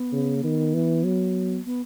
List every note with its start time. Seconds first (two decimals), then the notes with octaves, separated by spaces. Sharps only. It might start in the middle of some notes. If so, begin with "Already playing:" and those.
Already playing: B3
0.12 C#3
0.35 A#3
0.43 D#3 B3
0.74 E3
1.04 F#3
1.65 B3